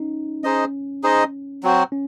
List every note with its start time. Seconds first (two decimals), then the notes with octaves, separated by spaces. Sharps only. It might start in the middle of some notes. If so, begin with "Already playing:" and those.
Already playing: C#4 D#4
0.44 C#4 D#4 G#4 C5 D#5
1.03 D#4 G#4 C5 D#5
1.63 F#3 C4 F#4 C5
1.92 C#4